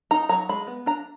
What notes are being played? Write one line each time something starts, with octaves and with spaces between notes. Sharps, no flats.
D#4 A#5
F#3 A#5
G#3 B5
B3
D4 A#5